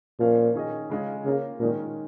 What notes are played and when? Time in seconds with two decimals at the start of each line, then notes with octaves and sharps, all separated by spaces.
0.20 A#2 F3 C#4 A#4 F5
0.55 D#3 C#4 G#4 D#5
0.90 C#3 G#3 C#4 F4 C#5
1.25 C#3 A#3 F4 A#4
1.60 A#2 D#3 G#3 C#4 A#4